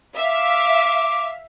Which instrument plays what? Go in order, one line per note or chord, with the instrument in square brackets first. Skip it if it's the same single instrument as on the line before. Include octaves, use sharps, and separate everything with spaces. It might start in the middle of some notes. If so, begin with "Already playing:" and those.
[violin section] E5 F5 [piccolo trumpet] D6